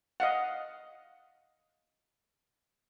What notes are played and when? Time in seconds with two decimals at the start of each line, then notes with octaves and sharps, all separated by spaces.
0.20 D#5 F5 F#5